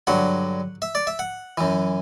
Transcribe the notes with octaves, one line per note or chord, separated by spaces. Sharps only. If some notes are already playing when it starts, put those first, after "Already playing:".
G2 D3 F#3 F#5
E5
D5
E5
F#5
F#2 E3